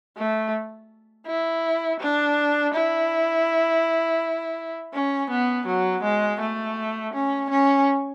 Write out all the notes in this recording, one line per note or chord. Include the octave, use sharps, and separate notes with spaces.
A3
E4
D4
E4
C#4
B3
F#3
G#3
A3
C#4
C#4